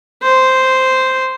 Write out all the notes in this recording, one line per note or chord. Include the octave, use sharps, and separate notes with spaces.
C5